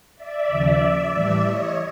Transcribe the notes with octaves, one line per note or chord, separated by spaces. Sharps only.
D5 E5
D#2 C#3 F3
A2 E3 G3 D5 E5
C#5 D#5